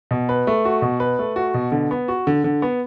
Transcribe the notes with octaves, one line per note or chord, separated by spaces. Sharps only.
B2
B4
A3
F#4
B2
B4
A3
F#4
B2
D3
B3
F#4
D3
D3
B3